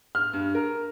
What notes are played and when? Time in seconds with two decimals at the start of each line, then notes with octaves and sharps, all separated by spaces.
0.15 F6
0.33 G2
0.55 A#4